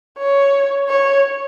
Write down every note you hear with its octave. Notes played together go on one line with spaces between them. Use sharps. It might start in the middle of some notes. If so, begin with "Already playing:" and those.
C#5
C#5